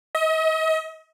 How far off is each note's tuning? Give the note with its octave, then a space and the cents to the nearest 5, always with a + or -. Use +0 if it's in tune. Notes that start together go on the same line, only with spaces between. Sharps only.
D#5 +40